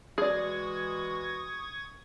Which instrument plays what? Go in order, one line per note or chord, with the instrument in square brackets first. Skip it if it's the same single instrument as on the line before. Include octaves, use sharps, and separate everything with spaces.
[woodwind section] E3 G#3 F#4 [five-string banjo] G#4 D5 [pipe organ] C#6 D#6 G#6